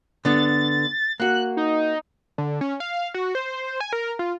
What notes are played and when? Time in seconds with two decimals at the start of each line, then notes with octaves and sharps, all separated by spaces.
0.25 D3 B3 D4 A6
1.20 A#3 F#4 F#6
1.57 D#4
2.38 D3
2.61 C#4
2.80 F5
3.14 F#4
3.35 C5
3.80 G#5
3.93 A#4
4.19 F4